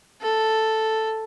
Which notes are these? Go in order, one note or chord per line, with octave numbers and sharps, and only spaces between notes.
A4